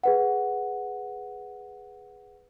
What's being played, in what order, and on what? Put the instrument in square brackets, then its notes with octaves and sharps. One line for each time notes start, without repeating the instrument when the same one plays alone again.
[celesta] G#4 B4 F#5